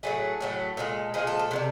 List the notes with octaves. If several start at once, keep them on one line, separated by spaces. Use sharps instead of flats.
A2 F#3 A3 G#4
A2 F#3 A3
A#2 F3 G#3 A4
A#2 F3 G#3 G#4
A4
A4
C3 D#3 G3